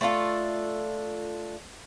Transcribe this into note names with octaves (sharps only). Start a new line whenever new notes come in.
A3 D4 F4 A4